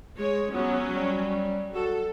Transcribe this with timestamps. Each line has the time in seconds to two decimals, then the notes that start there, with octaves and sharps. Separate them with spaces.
0.18 G#3 C#5
0.52 F#3 B3 C#4
0.95 G3
1.74 F#4 A4